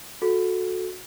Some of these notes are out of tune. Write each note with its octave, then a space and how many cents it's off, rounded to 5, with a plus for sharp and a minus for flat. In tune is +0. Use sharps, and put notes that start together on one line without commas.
F#4 -20 A4 -10